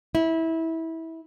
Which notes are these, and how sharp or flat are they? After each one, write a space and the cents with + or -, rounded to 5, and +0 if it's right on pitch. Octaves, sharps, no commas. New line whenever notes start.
E4 -20